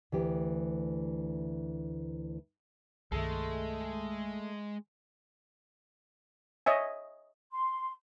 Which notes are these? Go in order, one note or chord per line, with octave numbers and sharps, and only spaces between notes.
D2 E3 G4
C2 G2 D#3 G#3 A3 A4
C#5 D#5 E5 G#5
C6